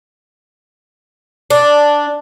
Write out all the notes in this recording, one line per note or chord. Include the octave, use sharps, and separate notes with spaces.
D4